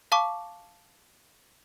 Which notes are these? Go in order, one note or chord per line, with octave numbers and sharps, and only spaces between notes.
F5 A5 C#6 D6